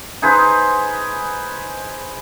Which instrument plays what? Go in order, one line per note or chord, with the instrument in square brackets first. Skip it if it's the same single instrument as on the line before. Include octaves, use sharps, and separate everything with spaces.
[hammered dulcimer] D#4 G#4 B4 C5